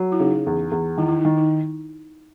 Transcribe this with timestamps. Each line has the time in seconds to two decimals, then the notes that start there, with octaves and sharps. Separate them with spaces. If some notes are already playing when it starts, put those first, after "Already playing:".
Already playing: F#3
0.12 E4
0.20 C#3 D#4
0.47 E2
0.71 E2
0.98 D#3 E4
1.08 E4
1.18 D#4
1.25 D#3
1.37 D#4